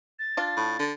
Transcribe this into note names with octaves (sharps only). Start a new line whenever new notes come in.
A6
D4 F4
A2
D3